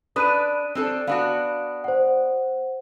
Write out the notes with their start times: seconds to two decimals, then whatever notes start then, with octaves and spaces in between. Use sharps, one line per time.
0.16 D4 B4 D#6 F#6 D#7
0.75 C4 D4 A4
1.07 B3 D4 F#4 F5
1.84 C5 F#5